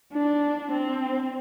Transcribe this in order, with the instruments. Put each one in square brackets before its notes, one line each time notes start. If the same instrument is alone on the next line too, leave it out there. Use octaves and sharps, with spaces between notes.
[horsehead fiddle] D4
C4